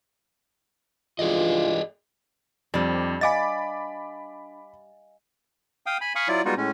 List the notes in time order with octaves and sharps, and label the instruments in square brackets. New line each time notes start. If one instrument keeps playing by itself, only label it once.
[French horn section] G2 E3 F4 [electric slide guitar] G#4 D5 D#5
[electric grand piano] F2 C4 [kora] G3 D4
[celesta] D#5 F5 G#5 [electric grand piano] B5 D6 A6
[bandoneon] F5 G5 D#6
G#5 B5
F5 G#5 B5 C#6 D#6
F#3 E4 F4 D5
G3 G#3 B3 D#4 F4 F#4
A2 G#3 C#4